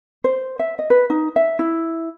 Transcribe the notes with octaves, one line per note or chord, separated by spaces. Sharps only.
C5
E5
D#5
B4
D#4
E5
E4